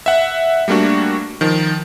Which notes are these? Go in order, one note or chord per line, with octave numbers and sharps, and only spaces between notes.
E5 F#5
G3 A3 A#3 D4 F#4
D#3 F3